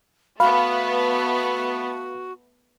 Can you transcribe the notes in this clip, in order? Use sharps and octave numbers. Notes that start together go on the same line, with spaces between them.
A3 B3 F#4 F5 B5